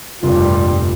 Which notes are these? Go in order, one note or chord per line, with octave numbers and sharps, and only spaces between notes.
F1 A#1 G2 G3 F4